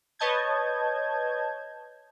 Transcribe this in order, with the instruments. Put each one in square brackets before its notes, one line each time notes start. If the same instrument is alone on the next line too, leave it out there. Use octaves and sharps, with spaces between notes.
[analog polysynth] B4 C#5 D#5 A5 G6 G#6